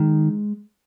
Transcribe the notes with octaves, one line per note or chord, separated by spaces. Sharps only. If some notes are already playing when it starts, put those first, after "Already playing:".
Already playing: D#3 G#3